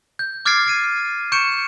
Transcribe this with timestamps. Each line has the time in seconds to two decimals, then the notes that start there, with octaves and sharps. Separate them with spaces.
0.19 G6
0.45 D6 F6 G#6 A6 C7 D7
0.66 A6 D7 D#7
1.32 C#6 G6 C#7 D7 E7